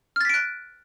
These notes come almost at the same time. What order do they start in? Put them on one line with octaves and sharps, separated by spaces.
F6 A6 B6 D7 F#6